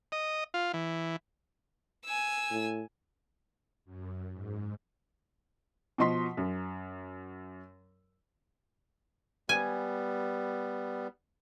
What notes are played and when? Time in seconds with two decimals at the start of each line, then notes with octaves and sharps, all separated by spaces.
0.12 D#5
0.54 F4
0.74 E3
2.05 G#5 E6
2.51 A2
3.85 F#2
4.33 G#2
5.98 B2 F3 D#5 C6 B6
6.37 F#2
9.49 G3 B3 G#5